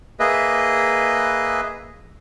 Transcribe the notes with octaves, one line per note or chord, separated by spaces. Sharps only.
A#3 G#4 B4 D#5 E5